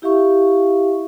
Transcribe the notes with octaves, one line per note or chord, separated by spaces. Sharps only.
E4 G4 E5 F5 C#6